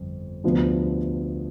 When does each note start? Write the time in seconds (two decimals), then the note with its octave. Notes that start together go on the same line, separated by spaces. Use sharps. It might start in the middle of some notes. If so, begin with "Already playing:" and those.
Already playing: G1 F2
0.44 D2 C3 F3 B3 D4